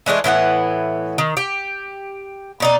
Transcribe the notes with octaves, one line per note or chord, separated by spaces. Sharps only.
E3 G#3 A3 D4
A2 E3 B3 F#5
D#3
G4
B2 D#4 D5